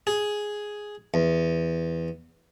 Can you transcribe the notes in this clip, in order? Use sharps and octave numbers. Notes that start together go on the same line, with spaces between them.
G#4
E2